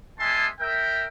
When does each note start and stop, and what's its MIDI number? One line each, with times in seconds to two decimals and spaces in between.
0.19 0.47 56
0.19 0.47 59
0.19 0.47 76
0.19 0.47 80
0.19 0.47 81
0.19 0.47 84
0.60 1.05 70
0.60 1.05 76
0.60 1.05 79